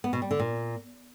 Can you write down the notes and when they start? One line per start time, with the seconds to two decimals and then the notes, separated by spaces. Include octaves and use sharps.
0.04 B3
0.13 B2
0.22 G3
0.31 D3
0.39 A#2